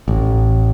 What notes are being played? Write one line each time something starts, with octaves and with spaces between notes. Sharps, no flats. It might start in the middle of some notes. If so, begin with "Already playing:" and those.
A1